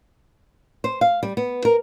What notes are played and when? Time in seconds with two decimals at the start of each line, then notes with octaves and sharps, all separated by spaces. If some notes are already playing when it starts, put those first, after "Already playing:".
0.84 C5
1.01 F5
1.23 G3
1.37 B3
1.65 A#4